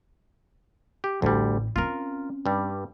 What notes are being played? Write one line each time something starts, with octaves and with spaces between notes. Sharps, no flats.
G4
A1 D2 G3 C4
C4 C#4 F4 A#4
G2 G3